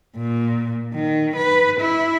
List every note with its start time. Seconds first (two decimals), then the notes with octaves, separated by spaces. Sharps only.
0.17 A#2
0.94 D#3
1.35 B4
1.80 E4